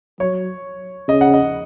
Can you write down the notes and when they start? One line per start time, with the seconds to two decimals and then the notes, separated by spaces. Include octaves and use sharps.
0.20 F#3 C#5
1.08 C#3 D#5
1.21 F#5
1.34 D#5